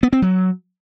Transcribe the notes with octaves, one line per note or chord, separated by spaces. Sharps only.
B3
C4
F#3